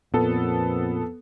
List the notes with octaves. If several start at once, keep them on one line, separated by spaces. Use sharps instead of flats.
F2 A#2 B3 A4